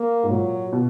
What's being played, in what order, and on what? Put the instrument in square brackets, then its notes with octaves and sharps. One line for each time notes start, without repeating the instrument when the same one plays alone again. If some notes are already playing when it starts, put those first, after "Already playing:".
Already playing: [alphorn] A#3
[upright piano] G#2
[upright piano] A#2 [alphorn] F#3
[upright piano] B2